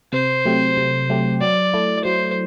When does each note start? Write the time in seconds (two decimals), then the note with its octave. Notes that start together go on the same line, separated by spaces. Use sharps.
0.13 C3 C5
0.45 F#3 A3 C4 G4
0.77 C3
1.09 F#3 A3 C4 G4
1.41 F#3 D5
1.74 A3 E4
2.05 F#3 C5